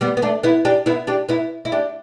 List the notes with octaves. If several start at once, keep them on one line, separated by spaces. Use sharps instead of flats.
G3 B3
B3
A3 D4
B3 E4
D4 G4
B3 E4
D4 G4
B3 E4
E4
D4 G4